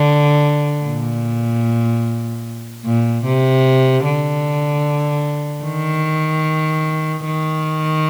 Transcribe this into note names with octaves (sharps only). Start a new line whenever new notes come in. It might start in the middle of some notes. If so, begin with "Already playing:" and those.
Already playing: D3
A#2
A#2
C3
D3
D#3
D#3